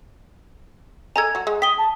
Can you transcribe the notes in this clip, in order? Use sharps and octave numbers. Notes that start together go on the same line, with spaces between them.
A4 D#5 G#5 A#5 G#6
F#3 F#4
G#3
G5 D#6 B6 G7
A5